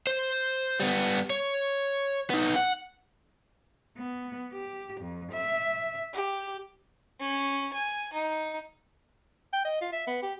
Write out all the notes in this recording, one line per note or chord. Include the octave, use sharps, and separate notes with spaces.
C5
G3 B3
C#5
B3 D#4
F#5
B3
G4
F2
E5
G4
C#4
G#5
D#4
G5
D#5
F4
E5
B3
G4